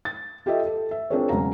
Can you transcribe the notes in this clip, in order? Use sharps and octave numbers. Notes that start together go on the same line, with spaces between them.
A6
F4 G4 A4 D#5 E5
A4
E5
C4 D4 F4 G#4 A#4 C#5
E1 C#3 F#3 F5 A#5